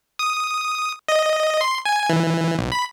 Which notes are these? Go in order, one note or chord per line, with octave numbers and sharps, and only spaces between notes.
D#6
D#5
C6
G#5
E3
B1
B5